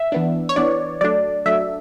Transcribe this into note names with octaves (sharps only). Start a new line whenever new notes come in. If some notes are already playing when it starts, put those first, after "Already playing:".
Already playing: E5
E3 B3 D4
C#5
E3 B3 D4 D5
F#3 A3 D4 D5
F#3 A3 D4 E5